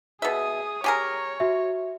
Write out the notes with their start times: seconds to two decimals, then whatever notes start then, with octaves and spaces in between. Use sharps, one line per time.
0.22 B2 G#4 E5 D#6
0.84 G4 G#4 A#4 C#5
1.40 F#4 E5